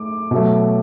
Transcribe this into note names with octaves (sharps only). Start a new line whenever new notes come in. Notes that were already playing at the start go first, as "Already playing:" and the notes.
Already playing: A3 D6
B2 F#3 A3